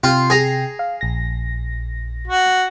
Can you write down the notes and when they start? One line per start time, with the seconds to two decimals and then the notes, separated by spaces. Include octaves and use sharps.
0.04 C3 F4 G5 C7
0.30 G#4 A#5
0.79 F5
1.01 A#1 A#6
2.27 F#4